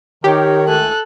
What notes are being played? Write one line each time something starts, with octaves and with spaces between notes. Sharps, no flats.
D#3 D#4 G4 A#4 C#5
C#2 A3 A4 G#5 F#6